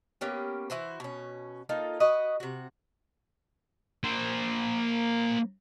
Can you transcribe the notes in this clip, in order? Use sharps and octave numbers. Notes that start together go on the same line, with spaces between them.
A#3 B3 C#4 G4
E3 E4 F#4 C5
B2 C#4
A#3 D#4 F4 A4
F#4 B4 D#5
C3 F#4
A#3 C5